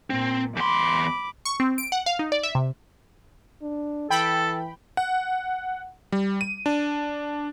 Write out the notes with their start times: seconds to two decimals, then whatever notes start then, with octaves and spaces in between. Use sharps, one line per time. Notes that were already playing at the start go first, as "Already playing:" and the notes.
0.10 A#2 C4
0.56 E2 B5 C6 D6
1.45 C#6
1.60 C4
1.78 D7
1.92 F#5
2.06 F5
2.19 D#4
2.32 D5
2.43 E5
2.55 C3
3.62 D4
4.10 E3 A4 G5 B5
4.97 F#5
6.12 G3
6.41 D#7
6.66 D4